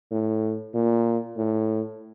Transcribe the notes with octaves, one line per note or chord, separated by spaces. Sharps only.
A2
A#2
A2